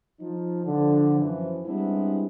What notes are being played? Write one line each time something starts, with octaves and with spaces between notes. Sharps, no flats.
F3 D#4
D3 F3
F#2 E3 F3
G3 G#3 B3 C4 D4 E4